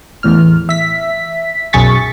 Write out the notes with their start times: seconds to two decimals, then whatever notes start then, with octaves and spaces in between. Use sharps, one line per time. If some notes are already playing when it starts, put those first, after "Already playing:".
0.23 E2 A2 F6
0.69 E5 B6
1.73 B1 F#2 G#4 C#6 A6 B6